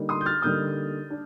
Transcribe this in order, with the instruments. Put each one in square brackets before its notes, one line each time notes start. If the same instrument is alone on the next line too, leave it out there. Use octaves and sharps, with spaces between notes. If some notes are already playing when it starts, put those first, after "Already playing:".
Already playing: [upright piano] D3 G3 A#3 D#4
C6 D#6
G6
F6 A6
D3 G3 A#3 D#4 D#6 G6
D4